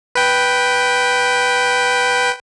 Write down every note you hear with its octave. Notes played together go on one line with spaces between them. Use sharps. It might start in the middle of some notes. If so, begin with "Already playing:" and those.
B4 G5